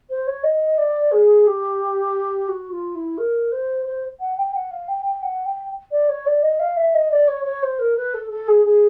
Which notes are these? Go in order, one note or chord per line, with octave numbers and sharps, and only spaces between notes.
C5
C#5
D#5
D5
G#4
G4
F#4
F4
E4
A#4
C5
C5
F#5
G5
F#5
F5
G5
G5
F#5
G5
D5
C#5
D5
D#5
F5
E5
D#5
D5
C#5
C#5
C5
A#4
B4
A4
A4
G#4
G#4